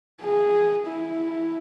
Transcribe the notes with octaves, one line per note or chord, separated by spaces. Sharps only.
G#4
E4